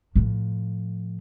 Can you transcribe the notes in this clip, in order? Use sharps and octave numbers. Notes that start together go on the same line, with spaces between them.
A2 F3